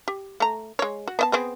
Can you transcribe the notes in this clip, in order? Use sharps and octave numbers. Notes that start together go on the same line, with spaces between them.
G4
A3 A#5
G#3 C#5
F#4
B3 D#5 A5
B3 C4 G#4